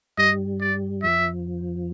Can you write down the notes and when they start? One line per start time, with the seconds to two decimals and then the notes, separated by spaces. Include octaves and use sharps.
0.18 G2 G3 D#5
0.61 D5
1.03 F2 F3 E5